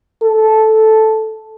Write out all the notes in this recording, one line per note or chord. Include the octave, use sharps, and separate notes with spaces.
A4